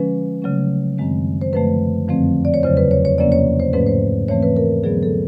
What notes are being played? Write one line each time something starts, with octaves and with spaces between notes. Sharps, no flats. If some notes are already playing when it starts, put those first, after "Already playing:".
Already playing: D3 F3 G#3 C#4 B4
C#3 F#3 A3 C#4
F#2 D#3 G#3 C4
C5
F#2 D3 F3 A3 B4
F2 D3 F3 A3 C4
D5
C#5
E2 C#3 F#3 C5
B4
C#5
C#5
E2 C3 F3 A#3 C#4 D5
C#5
C5
G#2 F3 A3 C#4 B4
C5
G#2 E3 A3 C4 C#5
B4
A#4
D3 F#3 B3 G#4
A4